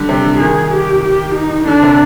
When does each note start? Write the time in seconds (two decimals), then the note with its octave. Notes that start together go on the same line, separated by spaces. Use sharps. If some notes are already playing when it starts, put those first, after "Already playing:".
Already playing: D3 G3
0.09 C3 G4
0.24 D3
0.40 D#3 G#4
0.72 G4
1.04 G4
1.35 D#4
1.67 D3 D4
1.83 C3